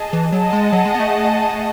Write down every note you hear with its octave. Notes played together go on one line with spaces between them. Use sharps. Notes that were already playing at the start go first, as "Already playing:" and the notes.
Already playing: G#4 D#5 A5
E3
F#3 G#4 D#5 F#5 A5
G#3
F#3
G#3
B3
A3